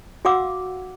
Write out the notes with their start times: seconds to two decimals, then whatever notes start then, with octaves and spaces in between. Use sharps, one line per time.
0.25 F#4 F5 F#5 D6 E6